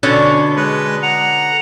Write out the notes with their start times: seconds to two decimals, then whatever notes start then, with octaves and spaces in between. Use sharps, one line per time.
0.03 B2 D3 C#4
0.56 G#3 B4
1.03 F#5 A#5